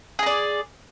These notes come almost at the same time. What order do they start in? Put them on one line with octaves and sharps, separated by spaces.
G#4 D#5 D5